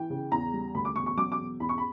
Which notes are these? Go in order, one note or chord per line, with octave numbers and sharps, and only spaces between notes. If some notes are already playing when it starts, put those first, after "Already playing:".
Already playing: E3 G5
C#3
E2 A#5
G3
D2 B5
D6
E1 C#6
C#6
F#3 D6
D6
E1
E2 B5
C#6
B5